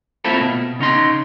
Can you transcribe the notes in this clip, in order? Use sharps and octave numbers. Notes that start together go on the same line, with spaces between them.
A3 A#3 C4 E4 F4 A4
B2
C#3 C#4 D#4 C6